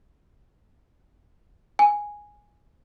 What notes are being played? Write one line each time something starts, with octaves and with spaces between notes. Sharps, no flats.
G#5